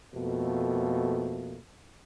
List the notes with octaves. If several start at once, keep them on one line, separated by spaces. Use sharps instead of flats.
F2 B2 A3 A#3